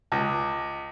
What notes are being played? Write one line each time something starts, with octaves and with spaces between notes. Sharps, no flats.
C#2